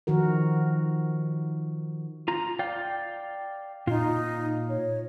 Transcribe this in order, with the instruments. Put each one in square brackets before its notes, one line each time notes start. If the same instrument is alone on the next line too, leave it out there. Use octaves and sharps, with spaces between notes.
[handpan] D#3 F3 F#4 A#4
[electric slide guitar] F4 A#5
D5 F5 G5
[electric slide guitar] A#2 F4 [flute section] D#4
[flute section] C#5